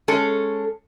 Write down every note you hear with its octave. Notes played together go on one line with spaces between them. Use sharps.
G#3 C#4 A4